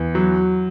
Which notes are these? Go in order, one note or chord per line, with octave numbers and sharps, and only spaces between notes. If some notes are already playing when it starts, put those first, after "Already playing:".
Already playing: E2
F#3